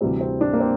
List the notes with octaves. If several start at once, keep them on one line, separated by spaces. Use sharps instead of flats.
D2 C3 E3 G3 C4
C4
D4
A#3
C4